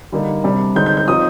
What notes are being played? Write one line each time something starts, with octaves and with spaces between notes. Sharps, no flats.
D3 G3 A#3 D#4
C3 G3 D4
D3 G#3 C4 D#4 G6
G6
G6
F3 C4 D#4 D#6